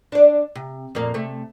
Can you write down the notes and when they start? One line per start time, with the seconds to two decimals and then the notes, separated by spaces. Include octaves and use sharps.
0.12 D4 D5
0.55 C3
0.95 F2 A#2 A#3
1.14 C3 A3